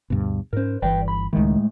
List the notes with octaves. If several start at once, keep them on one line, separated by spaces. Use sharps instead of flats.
D2 G2 B2
G#2 C#4 A#4 C5
G1 E3 B4 D5 G5
B5
C#2 A2 D#3 G#3